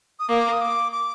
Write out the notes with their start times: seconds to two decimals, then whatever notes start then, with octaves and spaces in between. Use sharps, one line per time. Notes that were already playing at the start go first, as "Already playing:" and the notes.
0.20 D#6
0.29 A#3 D6
0.52 D#6
0.61 D6
0.92 D6